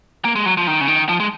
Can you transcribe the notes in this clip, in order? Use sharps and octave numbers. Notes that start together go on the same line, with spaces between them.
A#3
G#3
F#3
F3
D#3
C#3
D#3
F3
G#3